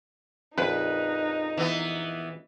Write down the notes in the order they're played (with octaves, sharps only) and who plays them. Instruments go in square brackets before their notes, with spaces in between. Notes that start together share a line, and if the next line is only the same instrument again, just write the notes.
[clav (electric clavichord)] A#1 F2 [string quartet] D#4 [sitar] B4
[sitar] E3 B3